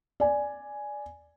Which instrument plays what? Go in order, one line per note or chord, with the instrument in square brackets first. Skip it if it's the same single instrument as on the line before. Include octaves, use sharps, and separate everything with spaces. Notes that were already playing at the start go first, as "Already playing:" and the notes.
[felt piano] D5 G#5